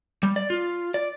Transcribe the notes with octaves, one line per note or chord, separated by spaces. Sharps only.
G3
D5
F4
D5